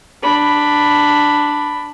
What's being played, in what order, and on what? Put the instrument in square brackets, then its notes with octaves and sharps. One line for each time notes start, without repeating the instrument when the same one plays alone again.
[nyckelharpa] D4 B5